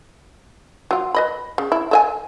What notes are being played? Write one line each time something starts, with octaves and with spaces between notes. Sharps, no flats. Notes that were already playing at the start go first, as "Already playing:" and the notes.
F#3 F4
B4 D#5 B5
C#3
E4
A4 E5 G#5